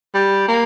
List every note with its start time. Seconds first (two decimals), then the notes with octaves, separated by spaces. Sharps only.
0.14 G3
0.48 A#3